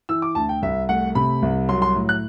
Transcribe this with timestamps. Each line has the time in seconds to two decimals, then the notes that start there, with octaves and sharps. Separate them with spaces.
0.09 E3 E6
0.22 D6
0.35 D2 A5
0.49 G5
0.62 C2 E5
0.89 A3 F#5
1.15 C3 B5
1.42 C2
1.69 F#3 C6
1.82 C6
1.95 A2
2.09 F#6